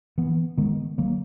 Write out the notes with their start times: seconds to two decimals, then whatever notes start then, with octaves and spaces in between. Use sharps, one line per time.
0.18 E3 B3
0.57 D#3 G#3 B3
0.98 D#3 F#3 A#3